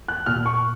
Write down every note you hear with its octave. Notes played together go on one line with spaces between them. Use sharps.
F#6
A#2 F6
C#6